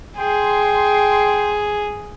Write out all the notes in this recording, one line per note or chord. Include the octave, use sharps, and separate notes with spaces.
G#4 G5 C6